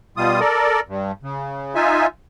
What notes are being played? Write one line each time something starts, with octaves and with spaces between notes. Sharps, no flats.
B2 G3 F4 D#6
A4 A#4 D5
G2
C#3
D#4 F4 E5 G#5